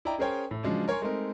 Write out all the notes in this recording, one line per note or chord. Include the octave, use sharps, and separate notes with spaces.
E4 D5 D#5 G5 A#5
C#4 G#4 A#4 C5 C#5 G5
A2
C#3 F3 F#3 G#3 C#4 D4
A#4 C#5 G#5 C6 C#6
G#3 A3 C4 D#4 A#4